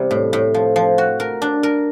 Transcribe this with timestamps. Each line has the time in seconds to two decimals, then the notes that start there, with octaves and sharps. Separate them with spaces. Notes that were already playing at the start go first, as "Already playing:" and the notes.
Already playing: E2 C3 G3
0.11 A2
0.33 A2
0.54 F3
0.76 F3
0.98 F#4
1.20 A#4
1.42 D4
1.63 A#4